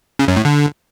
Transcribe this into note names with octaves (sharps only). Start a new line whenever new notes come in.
C#3
F#2
A2
D3